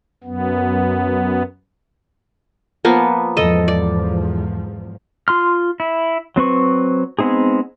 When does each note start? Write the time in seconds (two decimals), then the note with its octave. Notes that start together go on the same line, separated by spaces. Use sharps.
0.24 F#2 B3
2.85 F3 A#3 B3
3.37 E2 G#2 F3 A4 D#5
3.68 D5
5.28 F4 C6 F6
5.80 E4
6.36 F#3 C4 B4 C#6
7.19 G#3 B3 C4 D#4 G#4